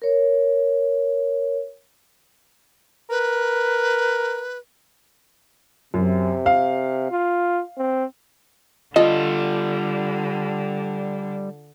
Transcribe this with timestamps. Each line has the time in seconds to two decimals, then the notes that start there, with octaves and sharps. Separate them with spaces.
0.02 A#4 C#5
3.10 A#4 B4
5.94 F#2 C3
6.46 F5
7.11 F4
7.78 C4
8.96 D3 G3 F4 A4 D#5